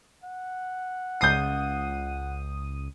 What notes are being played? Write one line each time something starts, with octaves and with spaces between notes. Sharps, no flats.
F#5
C#2 D#6 G6 C7 D#7